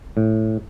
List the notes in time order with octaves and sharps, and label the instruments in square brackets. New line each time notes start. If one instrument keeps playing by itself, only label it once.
[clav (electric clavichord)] A2